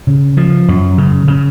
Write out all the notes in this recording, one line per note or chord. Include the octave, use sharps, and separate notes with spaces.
C#3
F3
F#2
C#3
C#3